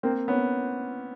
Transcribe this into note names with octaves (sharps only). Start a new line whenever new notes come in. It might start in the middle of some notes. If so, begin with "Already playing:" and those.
A#3 C4
B3 C#4